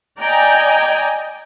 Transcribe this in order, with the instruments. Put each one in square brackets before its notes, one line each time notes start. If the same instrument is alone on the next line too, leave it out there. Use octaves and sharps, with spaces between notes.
[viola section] D5 D#5 G5 G#5 A#5